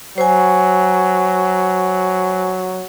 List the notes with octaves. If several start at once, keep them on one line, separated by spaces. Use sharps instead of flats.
F#3 C5 G#5